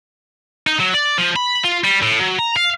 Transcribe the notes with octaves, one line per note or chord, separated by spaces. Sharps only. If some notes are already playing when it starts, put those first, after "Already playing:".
D#4
F#3
D5
F3
B5
F4
G3
A2
F#3
A#5
F5